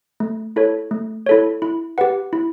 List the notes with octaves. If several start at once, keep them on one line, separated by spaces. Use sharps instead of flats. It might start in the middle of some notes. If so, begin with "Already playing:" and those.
A3
E4 A4 C#5
A3
E4 A4 C#5
E4
G4 B4 F#5
E4